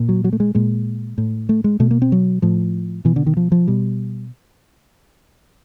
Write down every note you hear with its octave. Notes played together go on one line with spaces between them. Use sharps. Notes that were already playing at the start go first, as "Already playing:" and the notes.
Already playing: A#2
F#3
F#3
A3
G#3
A#2 G#3
A2
A3
G#3
B2 A3
A#3
C4
F#3
A2 F3
B2 E3
D3
D#3
F3
F3
B2 G3